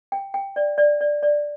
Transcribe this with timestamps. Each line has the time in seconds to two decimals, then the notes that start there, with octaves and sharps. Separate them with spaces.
0.12 G5
0.34 G5
0.56 D5
0.78 D5
1.01 D5
1.23 D5